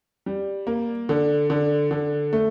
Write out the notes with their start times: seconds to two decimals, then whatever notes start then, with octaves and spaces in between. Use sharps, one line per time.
0.26 G3
0.67 A#3
1.09 D3
1.50 D3
1.91 D3
2.33 A3